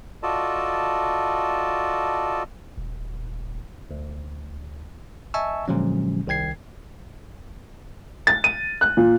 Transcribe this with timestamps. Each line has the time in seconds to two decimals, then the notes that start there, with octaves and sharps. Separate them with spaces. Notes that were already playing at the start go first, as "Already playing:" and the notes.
0.23 F4 F#4 A4 D5 D#5 A5
2.78 D#1
3.91 D2
5.34 D#5 E5 G#5 A5 C#6 E6
5.68 A#2 D3 F3 F#3 G#3 C#4
6.27 C2 D#3 G5 G#6 C7
8.27 A6
8.44 D#7
8.81 F#6
8.97 A#2